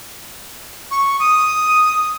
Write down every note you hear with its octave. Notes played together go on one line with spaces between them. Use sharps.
C#6
D#6